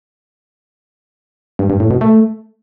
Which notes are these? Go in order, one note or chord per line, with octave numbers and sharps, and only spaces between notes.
G2
G2
A2
B2
A3